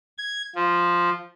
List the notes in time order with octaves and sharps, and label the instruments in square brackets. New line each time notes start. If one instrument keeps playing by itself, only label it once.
[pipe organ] G#6
F3